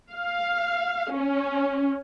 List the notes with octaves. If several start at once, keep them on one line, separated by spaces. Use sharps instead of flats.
F5
C#4